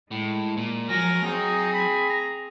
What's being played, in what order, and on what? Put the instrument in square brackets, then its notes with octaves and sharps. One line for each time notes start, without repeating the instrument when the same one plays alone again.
[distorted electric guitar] A2 [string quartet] G#3
[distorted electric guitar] A#2
[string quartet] F3 G#5 A#6 [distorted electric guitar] F#3 [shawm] A#4
[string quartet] C4 G#4 [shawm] D#4
[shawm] B5
A#5